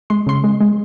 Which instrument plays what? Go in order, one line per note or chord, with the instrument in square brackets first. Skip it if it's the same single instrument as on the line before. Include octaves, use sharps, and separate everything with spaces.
[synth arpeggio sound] G#3 C6
C#3 C6
G#3
G#3